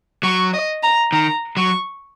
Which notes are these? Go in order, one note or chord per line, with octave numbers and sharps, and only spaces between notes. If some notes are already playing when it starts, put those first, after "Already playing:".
F#3 C#6
D#5
A#5
D#3 A#5
F#3 C#6